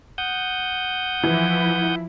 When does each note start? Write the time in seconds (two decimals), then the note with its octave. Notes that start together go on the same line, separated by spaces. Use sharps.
0.18 F#5 D#6 G6
1.23 E3 F3 E4